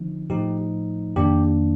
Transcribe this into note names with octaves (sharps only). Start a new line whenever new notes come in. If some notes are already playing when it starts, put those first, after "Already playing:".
Already playing: D3 F3 C4 D#4
A2 F3 A3 D#4 G4
F2 D#3 A#3 D4 G4